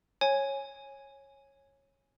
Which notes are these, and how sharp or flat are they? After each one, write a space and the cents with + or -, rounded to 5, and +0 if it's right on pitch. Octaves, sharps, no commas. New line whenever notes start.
C#5 -15 G#5 +0